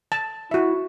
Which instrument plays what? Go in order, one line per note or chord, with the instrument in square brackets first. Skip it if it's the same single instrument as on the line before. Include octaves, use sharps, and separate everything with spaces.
[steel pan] A5
[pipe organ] E4 [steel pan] F#4 E5